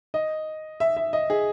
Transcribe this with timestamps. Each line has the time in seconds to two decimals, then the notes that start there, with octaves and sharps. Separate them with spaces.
0.14 D#5
0.80 E5
0.96 E5
1.13 D#5
1.30 G#4